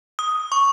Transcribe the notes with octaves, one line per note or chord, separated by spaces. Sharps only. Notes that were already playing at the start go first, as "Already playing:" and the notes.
D#6
C#6